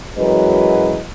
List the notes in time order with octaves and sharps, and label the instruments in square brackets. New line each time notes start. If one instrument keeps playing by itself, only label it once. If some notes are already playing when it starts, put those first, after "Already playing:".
[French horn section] F#2 E3 F#3 G#3 B4 D#5